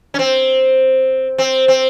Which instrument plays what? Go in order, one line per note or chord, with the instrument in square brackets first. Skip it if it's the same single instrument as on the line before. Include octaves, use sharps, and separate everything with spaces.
[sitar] C#4
C4
C4
C4